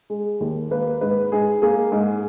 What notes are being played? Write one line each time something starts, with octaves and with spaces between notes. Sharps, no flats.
G#3
D#2
A#3 B4
G#2 B4
G#2 G#4
A#3 G#4
G#2